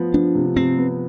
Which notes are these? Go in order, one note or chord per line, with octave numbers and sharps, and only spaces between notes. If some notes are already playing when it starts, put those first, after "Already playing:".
Already playing: F3 B3
F3 D4
C3
C3 C4
B3